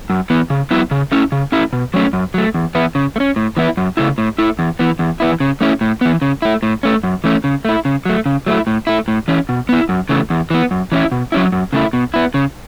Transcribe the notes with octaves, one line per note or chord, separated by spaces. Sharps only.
F#2
E3 B3
C#3
F#3 B3 E4
C#3
A3 C#4 E4
C#3
A3 C#4 E4
B2
F#3 A3 C#4
F#2
F#3 A3
E2
E3 B3 E4
C#3
A3
C#4
A2
E3 B3 E4
F#2
C#3 A3 E4
A2
A3 E4
E2
E3 B3
E2
E3 B3 E4
C#3
A3 C#4 E4
A2
E3 B3
C#3
A3 E4
A2
A3 C#4
F#2
E3 A3 C#4
C#3
A3 E4
C#3
F#3 A3
C#3
F#3 A3 E4
A2
A3 E4
A2
E3 C#4
B2
B3 E4
F#2
C#3 E3 A3
E2
E3 B3
F#2
E3 C#4 E4
B2
F#3 C#4 E4
F#2
C#3 A3 E4
B2
B3 E4
C#3